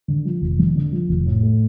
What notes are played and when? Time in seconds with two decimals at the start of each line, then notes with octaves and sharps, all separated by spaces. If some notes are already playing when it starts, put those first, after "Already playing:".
0.08 D3
0.25 F3
0.42 F1
0.59 F2
0.76 D3
0.92 F3
1.09 F1
1.26 A2
1.43 A3